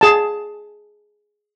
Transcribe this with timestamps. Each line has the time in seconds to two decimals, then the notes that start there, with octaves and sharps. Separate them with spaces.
0.01 G#4 A5